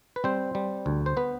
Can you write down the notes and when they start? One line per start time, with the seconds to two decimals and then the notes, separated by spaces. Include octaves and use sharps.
0.16 B4
0.24 G3 C4 C5
0.55 G3
0.86 D2
1.06 C5
1.17 B3 B4